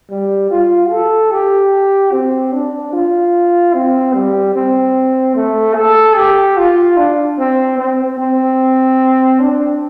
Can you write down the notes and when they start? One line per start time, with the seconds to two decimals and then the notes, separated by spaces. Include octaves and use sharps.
0.10 G3
0.51 F4
0.90 A4
1.31 G4
2.12 C4
2.53 D4
2.93 F4
3.74 C4
4.14 G3
4.55 C4
5.35 A3
5.76 A4
6.16 G4
6.57 F4
6.97 D4
7.38 C4
7.78 C4
8.18 C4
9.40 D4